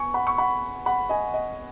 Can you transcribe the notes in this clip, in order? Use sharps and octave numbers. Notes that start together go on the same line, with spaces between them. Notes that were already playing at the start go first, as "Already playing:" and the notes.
Already playing: B3 G#5 C#6
F#5 B5
C#6
F#5 B5
F#5 B5
D#5 G#5
D#5